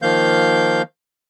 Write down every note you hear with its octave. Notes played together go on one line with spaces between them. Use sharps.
D#3 F3 A#3 F5 G6